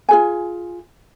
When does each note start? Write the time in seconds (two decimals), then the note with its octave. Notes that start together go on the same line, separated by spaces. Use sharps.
0.09 F4 G#4 G#5